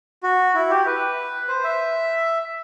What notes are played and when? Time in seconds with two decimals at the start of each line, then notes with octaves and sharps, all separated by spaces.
0.23 F#4
0.55 E4
0.70 G4
0.86 B4
1.48 C5
1.64 E5